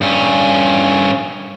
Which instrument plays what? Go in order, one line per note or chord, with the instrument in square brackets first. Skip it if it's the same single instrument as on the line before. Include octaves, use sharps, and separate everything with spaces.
[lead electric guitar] G2 C#4